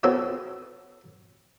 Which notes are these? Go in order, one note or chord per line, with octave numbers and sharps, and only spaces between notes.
C4 F#4 A4 B4 C#5